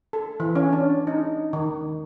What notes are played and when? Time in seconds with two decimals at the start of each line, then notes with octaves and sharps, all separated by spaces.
0.13 A4
0.40 E3
0.55 C#4
0.73 D4
1.07 D#4
1.53 D#3